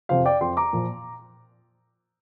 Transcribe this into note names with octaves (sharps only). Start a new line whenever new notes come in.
F2 C3 F3 C5 F5
D5 G5
F2 F3 G5 C6
A#5 D6
A#2 F3